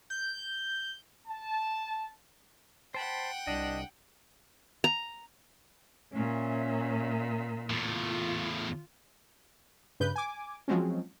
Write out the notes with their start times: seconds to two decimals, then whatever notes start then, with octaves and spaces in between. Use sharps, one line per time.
0.10 G6
1.27 A5
2.94 C5 F#5 G5 A5 B5
3.47 C2 D4 D#5
4.84 A#5
6.14 A#2 C#4 E5
7.70 E2 A2 F4
10.00 G2 C#3 B4 G6
10.16 G#5 D6
10.68 F3 F#3 G#3 C4 C#4